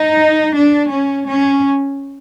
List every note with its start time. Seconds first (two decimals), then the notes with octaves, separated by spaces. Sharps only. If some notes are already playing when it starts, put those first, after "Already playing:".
Already playing: D#4
0.56 D4
0.91 C#4
1.28 C#4